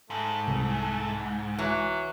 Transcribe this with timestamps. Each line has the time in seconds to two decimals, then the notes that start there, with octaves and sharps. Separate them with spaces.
0.10 G#2 A3
0.48 C2
1.59 E3 F#3